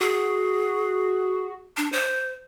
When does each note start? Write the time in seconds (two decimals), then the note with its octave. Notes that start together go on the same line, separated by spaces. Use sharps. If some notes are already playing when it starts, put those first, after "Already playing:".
0.01 F#4 G#4
1.77 D4
1.92 C5